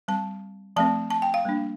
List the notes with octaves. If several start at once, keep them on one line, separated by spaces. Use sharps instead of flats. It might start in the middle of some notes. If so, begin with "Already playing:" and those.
G3 C4 A5
F3 A3 C4 A5
A5
G5
F5
G3 A#3 D4